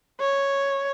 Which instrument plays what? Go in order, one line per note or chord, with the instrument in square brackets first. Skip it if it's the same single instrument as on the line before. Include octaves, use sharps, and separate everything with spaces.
[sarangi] C#5